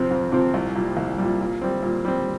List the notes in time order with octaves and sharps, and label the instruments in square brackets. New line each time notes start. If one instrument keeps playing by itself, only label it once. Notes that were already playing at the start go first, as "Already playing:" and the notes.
Already playing: [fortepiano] F2 C3 F3 C4
F2
C3 F3 C4
C2
A#2 G3
C2
A#2 G3
A#2
G3 C4
A#2
G3 C4